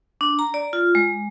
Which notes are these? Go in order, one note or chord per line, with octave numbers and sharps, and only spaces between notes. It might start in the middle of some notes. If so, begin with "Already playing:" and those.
D4
A#5
D5
F4
G#3